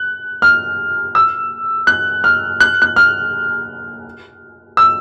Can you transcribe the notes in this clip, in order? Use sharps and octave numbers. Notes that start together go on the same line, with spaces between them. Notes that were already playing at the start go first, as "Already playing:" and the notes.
Already playing: F#6
F6
E6
F#6
F6
F#6
F#6
F6
E6